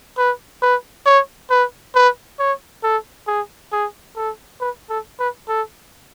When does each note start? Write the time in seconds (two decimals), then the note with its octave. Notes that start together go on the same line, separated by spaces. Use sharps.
0.18 B4
0.62 B4
1.06 C#5
1.50 B4
1.95 B4
2.39 C#5
2.84 A4
3.28 G#4
3.72 G#4
4.16 A4
4.60 B4
4.90 A4
5.20 B4
5.48 A4